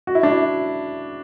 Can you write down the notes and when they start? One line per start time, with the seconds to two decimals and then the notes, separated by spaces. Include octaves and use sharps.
0.07 F#4
0.15 E4
0.23 D4
0.31 E4